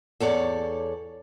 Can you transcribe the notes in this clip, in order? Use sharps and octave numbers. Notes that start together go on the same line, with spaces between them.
E2 A4 C#5 D5